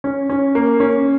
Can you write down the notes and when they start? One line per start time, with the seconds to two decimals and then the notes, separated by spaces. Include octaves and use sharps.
0.04 C#4
0.29 C#4
0.55 A#3
0.80 C#4